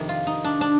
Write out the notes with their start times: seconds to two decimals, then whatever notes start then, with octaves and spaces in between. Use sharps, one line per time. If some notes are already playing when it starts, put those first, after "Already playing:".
Already playing: F2 C3 D#3
0.09 F4
0.27 D#4
0.44 D4
0.61 D4